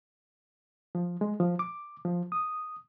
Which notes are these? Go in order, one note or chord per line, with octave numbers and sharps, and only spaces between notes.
F3
G#3
F3
D6
F3
D#6